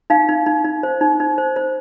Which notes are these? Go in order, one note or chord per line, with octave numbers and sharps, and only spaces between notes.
D#4 F5
D#4
D#4
D#4
C5
D#4
D#4
C5
C5